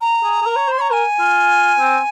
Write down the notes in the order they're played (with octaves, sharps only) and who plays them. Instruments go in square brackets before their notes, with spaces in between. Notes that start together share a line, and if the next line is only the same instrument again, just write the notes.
[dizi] A#5
[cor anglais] G#4
G#4
A#4
C#5
[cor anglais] C5 [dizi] C6
[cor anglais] C#5 [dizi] A#5
[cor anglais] A#4 [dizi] G#5 A#5
[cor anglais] F4
C4